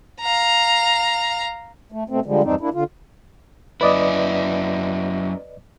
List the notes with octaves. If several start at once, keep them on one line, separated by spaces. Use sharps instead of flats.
F5 A#5
A3
B2 A3 C4
D3 F3 G3 G#3
E2 G2 C4 D4 D#4
A#3 D4 E4
D3 F4
F#2 E4 B4 D5 D#5